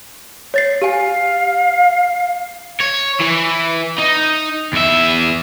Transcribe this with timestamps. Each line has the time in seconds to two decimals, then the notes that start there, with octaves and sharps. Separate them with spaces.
0.54 C#5 A6 C7
0.82 G4 F5 G#5
2.81 C#5
3.20 E3
3.99 D#4
4.73 E2 E5